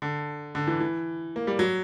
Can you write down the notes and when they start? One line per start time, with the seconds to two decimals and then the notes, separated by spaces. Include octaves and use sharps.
0.02 D3
0.55 D3
0.67 E3
0.80 E3
1.36 A#3
1.47 G3
1.59 F#3